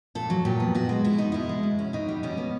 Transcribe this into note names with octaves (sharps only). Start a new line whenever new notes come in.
A#2 A4
F#3
A#2 G4
B3
B2 F#4
G#3
B2 E4
B3 D#4
B2 E4
G#3
B2
C#4
B2 D#4
G3
B2 C#4
B3